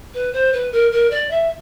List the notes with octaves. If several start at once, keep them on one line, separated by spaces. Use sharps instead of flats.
B4
C5
B4
A#4
A#4
D5
E5